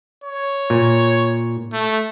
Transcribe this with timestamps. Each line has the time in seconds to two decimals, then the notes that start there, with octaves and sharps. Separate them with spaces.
0.24 C#5
0.70 A#2
1.73 A3